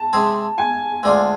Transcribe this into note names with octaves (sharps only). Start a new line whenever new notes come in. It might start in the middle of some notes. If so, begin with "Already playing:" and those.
Already playing: A5
C3 G#3 C4 G#4
G#5
D2 D3 G#3 D4 F4